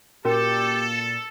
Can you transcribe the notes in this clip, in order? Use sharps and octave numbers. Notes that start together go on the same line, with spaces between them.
A#2 C#4 F#4 G4 A4 A#4